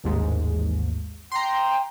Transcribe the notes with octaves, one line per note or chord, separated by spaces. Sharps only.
A1 D#2 G#2
G5 A#5 C6